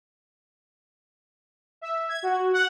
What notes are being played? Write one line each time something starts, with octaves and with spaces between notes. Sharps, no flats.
E5
G#6
F#4
F#5